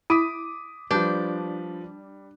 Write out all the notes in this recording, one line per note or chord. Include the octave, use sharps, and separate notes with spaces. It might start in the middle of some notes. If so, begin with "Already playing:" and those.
E4 D6 D#6 B6 D7 D#7
F3 G3 D4 B4 G6